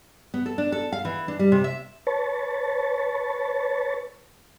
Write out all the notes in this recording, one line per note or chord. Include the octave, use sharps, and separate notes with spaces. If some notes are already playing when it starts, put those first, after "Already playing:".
B3
A4
D4
A4
F5
E3
D4
G3
C3
E5
B4 C#5 A5